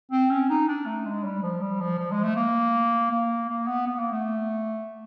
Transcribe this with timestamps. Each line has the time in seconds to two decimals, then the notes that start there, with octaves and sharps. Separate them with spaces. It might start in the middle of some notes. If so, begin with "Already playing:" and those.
0.11 C4
0.31 C#4
0.50 D#4
0.68 D4
0.86 A3
1.06 G#3
1.24 G3
1.43 F3
1.62 G3
1.80 F3
1.99 F3
2.12 G#3
2.23 A3
2.36 A#3
3.11 A#3
3.50 A#3
3.67 B3
3.87 B3
3.99 A#3
4.11 A3